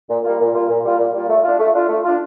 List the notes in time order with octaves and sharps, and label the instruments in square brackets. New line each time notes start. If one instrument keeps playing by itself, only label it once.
[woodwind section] A#2
G3 A#3 F4
A#2
G3 A#3 F4
A#2
G3 A#3 F4
A#2
G3 A#3 F4
A3
D4 F4
A3
D4 F4
A3
D4 F4